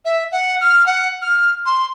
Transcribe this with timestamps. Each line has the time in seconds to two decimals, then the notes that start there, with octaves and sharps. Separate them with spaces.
0.05 E5
0.32 F#5
0.61 F6
0.86 F#5
1.22 F6
1.66 C6